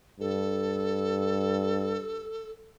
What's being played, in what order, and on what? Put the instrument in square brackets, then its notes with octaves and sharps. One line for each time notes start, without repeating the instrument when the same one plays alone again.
[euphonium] G2 [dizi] A4